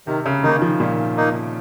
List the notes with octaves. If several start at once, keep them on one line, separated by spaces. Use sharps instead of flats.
C3 D#3
C#3
D#3 A#3 D#4
F3
A#2 D#3
A#3 D#4